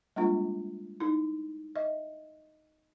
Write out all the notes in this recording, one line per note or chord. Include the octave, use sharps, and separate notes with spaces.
G3 G#3 A#3 D4 F4
D#4 E4
D#5 E5